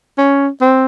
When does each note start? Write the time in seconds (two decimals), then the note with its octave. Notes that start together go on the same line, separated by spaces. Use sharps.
0.18 C#4
0.61 C4